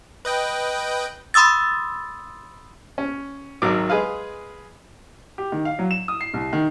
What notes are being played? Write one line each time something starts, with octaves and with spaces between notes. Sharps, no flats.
B4 D#5 G5
B5 C6 D#6 E6 A6
C#4
G#1 D#3 F#3 D6
G#3 G#4 B4 F5
G4
D#3
F5
F#3
E7
D#6
C7
C2
D#3